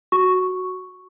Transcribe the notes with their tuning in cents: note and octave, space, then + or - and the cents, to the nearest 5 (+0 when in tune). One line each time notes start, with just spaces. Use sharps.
F#4 +0 C#6 +0